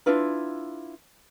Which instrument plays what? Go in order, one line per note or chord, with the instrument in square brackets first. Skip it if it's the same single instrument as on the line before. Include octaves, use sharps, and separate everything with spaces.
[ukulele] D4 E4 F4 B4